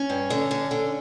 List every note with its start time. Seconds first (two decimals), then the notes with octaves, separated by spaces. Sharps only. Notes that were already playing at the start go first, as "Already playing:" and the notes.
Already playing: C#4
0.10 G2
0.30 D3
0.51 D3
0.71 D3